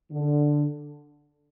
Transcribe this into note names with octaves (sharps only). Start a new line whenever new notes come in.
D3